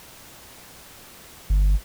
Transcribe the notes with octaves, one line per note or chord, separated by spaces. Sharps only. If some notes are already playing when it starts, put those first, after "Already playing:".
G1